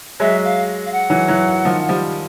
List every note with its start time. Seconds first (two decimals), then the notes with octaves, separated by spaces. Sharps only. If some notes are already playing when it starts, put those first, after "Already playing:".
0.20 F#3 G#3 E5
0.44 F5
0.86 F5
0.92 F#5
1.10 E3 F#3
1.28 E3 F#3
1.65 D#3 F3
1.89 F3 G3